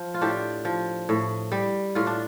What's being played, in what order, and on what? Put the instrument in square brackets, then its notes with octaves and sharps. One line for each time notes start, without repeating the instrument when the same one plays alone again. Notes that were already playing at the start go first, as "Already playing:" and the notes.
Already playing: [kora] F3
F4
A2 D4 G4
F3
A2
G3
A2 F4
D4